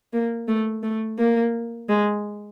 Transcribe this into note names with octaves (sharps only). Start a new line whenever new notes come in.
A#3
A3
A3
A#3
G#3